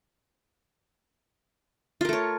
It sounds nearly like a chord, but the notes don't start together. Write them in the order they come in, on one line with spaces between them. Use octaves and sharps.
F4 A#4 A3 C#5